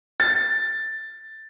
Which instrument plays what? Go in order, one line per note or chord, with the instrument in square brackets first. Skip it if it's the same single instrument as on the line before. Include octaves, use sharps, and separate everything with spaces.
[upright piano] A6